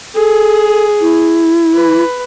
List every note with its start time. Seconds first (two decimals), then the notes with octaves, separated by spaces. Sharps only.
0.15 G#4 A4
1.01 E4
1.74 B4